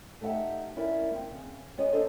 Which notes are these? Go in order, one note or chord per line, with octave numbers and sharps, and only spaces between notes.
A3 D#4 G4 E5 F#5
C#4 E4 A#4 D5
A#3 C4
E2 C#3
B3 C#4 C#5 D#5
A#3 D4 A4 C5 D#5